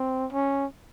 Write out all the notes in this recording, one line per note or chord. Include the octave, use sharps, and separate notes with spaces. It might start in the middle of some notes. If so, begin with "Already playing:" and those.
Already playing: C4
C#4